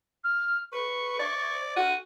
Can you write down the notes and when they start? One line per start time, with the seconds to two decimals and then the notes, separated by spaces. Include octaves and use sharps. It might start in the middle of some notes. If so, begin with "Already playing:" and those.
0.24 F6
0.72 B4 C#6
1.19 D5
1.76 F#4 D#7